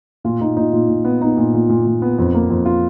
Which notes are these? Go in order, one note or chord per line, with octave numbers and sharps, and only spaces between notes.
A#2 F4
A#2 D#4
A#2 D#4
A#2 F4
A#2
B3
B3 D#4
A#2
A#2
A#2
A#2
B3
F2
A#3
F2
F4